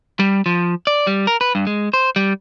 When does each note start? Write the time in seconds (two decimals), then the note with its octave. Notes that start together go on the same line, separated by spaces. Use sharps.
0.20 G3
0.46 F3
0.87 D5
1.07 G3
1.27 A#4
1.41 B4
1.55 G2
1.67 G#3
1.94 C5
2.16 G3